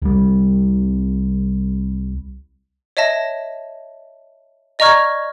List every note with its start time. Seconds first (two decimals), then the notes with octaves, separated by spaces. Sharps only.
0.02 C2 G3
2.97 C#5 D#5 E5 A5 A#6
4.79 D5 D#5 A#5 C#6 F6 G#6